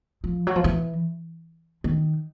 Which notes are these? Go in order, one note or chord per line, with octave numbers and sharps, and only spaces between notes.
F3
F#3
F3
E3
D#3